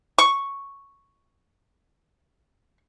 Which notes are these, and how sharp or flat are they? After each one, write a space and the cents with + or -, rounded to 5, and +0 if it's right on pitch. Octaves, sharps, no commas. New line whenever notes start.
C#6 +0